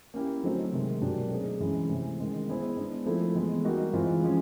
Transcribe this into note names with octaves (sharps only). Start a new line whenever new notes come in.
A#3 C#4 E4 G4 A#4
D3 F#3 A3 C4 D#4
C3 D#3 G#3
B2 F#3 A#3 D4 G4
A3 C4 D#4 G#4
E3 G#3 C#4 E4
C3 E3 A3
D#3 G#3 C#4
G#3 B3 E4 G#4 C5
G#3 B3 D4
F3 A3 C4 E4 A4
E3 G#3 B3
G3 A#3 D#4 F#4
E3 G#3 C4 F4
F3 G#3 C#4